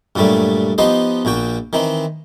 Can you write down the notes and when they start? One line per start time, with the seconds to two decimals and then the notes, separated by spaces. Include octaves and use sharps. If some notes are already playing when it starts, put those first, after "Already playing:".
0.16 G2 A#2 F#3 G3 A3
0.78 F3 B3 D#4 G4 C5 D#5
1.25 A#1 A#2 F#4 G5
1.73 D#3 E3 C4 D#4